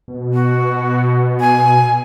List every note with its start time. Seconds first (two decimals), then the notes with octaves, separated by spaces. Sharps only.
0.08 B2
0.34 F#4
1.40 G#5